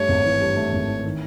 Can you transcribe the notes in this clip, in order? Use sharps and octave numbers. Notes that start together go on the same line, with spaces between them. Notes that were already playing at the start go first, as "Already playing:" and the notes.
Already playing: G2 A3 C#5
G#1
E3
G2
A3
G#1
E3
D#3